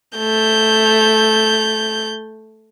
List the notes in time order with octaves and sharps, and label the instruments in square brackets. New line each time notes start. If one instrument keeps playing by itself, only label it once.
[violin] A3 G6